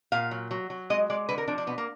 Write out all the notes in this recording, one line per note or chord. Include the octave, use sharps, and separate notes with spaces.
A#2 F5
F#3
F#3
F#3
G#3 D#5
G#3 D5
D3 B4
A#4
F3 D4
D4
B2 B3
A#3